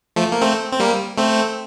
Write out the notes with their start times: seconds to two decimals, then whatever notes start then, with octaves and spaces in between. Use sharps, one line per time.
0.16 F3 A3
0.32 A#3
0.42 A3 C4
0.72 C4
0.80 G3 A#3
1.18 A3 C4